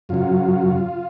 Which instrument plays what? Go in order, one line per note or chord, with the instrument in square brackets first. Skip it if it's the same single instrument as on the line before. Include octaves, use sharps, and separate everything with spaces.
[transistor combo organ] F#2 C#3 F#3 F4